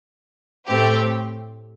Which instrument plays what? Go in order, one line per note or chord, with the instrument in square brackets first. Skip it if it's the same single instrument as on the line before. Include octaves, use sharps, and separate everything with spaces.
[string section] A2 A3 C4 G4